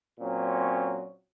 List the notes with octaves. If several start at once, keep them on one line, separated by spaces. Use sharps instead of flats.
A#2 F#3 C4 C#4